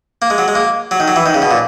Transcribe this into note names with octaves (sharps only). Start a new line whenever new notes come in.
A#3
G#3
F#3
G#3
A#3
F#3
D#3
F#3
E3
D#3
C#3
B2
A#2